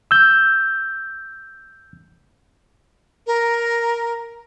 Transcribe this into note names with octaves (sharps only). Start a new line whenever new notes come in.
E6 G6
A#4